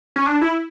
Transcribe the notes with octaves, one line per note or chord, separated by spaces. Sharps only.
C#4
D4
E4